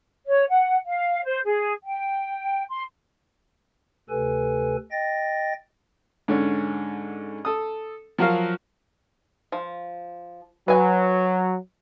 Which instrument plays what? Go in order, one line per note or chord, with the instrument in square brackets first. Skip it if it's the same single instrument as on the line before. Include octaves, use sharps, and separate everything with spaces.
[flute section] C#5
F#5
F5
C5
G#4
G5
C6
[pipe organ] D2 C3 A4 B4 G#5
D#5 G5 A6 A#6
[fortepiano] G#2 D3 C#4
A4 D#6
F3 F#3 F#4 A#4 F5
[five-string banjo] F3
[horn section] F#3 [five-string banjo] B4 G#5